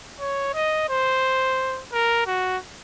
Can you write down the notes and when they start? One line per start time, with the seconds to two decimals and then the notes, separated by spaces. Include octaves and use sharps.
0.20 C#5
0.54 D#5
0.89 C5
1.92 A#4
2.26 F#4